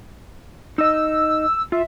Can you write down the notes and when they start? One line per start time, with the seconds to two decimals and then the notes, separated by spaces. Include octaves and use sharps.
0.78 D#4 D#5 E6
1.72 F4 E5